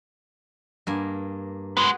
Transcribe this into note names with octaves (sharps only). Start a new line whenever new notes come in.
G2 A#3 G#5
G#3 B3 F#4 G#4 B4